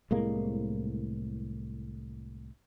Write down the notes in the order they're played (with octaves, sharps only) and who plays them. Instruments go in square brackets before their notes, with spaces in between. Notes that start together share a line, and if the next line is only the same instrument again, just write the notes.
[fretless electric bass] C2 A2 G#3 A#3